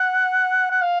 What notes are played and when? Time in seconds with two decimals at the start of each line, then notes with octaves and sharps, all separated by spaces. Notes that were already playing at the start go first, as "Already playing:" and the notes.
Already playing: F#5
0.71 F#5
0.82 F5